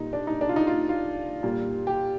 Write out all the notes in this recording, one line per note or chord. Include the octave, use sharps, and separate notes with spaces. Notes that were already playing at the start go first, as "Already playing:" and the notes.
Already playing: A#2 G3 A#3 D#4
D4
D#4
D4
F4
D#4
F4
F4
A#2 G3 A#3
G4